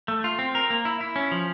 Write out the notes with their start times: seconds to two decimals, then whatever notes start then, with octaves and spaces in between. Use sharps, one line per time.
0.08 A3
0.24 F4
0.39 C4
0.55 A#4
0.70 A#3
0.85 E4
1.01 E4
1.16 C#4
1.32 F3